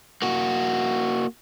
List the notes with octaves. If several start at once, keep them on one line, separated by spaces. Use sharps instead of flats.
A#3 F#4